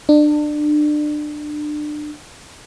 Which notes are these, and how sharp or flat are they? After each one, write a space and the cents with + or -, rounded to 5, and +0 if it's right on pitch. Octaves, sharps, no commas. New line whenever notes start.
D4 +30